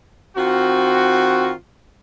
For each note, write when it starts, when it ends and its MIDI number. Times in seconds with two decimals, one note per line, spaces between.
0.37 1.52 51
0.37 1.52 60
0.37 1.52 65
0.37 1.52 66